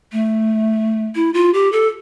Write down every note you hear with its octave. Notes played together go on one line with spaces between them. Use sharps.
A3
E4
F4
G4
A4